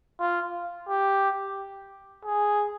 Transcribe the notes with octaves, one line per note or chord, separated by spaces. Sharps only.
F4
G4
G#4